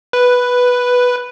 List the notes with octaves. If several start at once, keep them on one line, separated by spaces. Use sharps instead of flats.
B4